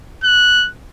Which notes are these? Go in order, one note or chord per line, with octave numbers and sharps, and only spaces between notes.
F#6